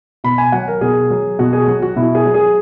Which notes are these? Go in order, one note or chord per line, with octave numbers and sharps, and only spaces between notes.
B2 B5
G#5
F#3 F#5
A#4
B2 G#4
F#3
B2 F#4
G#4
F#3 F#4
F#4
B2 E4
G#4
F#3
G#4